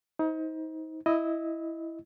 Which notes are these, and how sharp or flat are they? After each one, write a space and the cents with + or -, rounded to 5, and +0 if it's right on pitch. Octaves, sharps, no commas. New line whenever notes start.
D#4 +35 C5 +0
E4 +0 D#5 +0 E6 -25